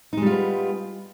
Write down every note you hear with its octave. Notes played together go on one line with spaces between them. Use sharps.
G3 G#3 B3 D#4 F4